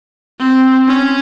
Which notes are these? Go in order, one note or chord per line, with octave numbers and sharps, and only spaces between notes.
C4
C#4